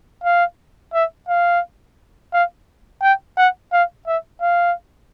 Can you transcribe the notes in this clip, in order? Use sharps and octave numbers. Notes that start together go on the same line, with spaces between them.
F5
E5
F5
F5
G5
F#5
F5
E5
F5